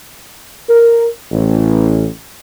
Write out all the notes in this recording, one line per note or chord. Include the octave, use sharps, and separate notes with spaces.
A#4
A1